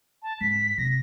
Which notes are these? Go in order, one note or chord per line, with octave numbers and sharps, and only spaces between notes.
A5
G#2 B6
C3 A#6